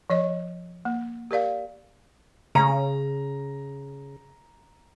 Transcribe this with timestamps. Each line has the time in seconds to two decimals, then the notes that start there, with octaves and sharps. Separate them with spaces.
0.10 F3 C#5 D#5
0.85 A#3
1.31 G4 A#4 D5 F5
2.55 C#3 A#5